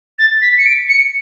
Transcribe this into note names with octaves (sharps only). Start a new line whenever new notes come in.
A6
B6
C#7
D7
C#7